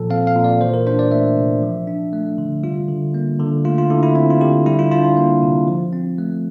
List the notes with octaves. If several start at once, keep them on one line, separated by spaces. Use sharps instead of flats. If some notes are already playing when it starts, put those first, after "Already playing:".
Already playing: A#2 F3 A4
C4 F5
F5
A#2
D5
E3 C5
A#4
D4 C5
D5
A3 E5
C3
F3
D4
A3
D3
G3 F4
D3
A#3
D3
A3 F4
F4
D3 E4
E4
C4 E4
F4
D3 G4
G3 E4
F4
D4 F4
F4
A#3
C3
F3
C4
A3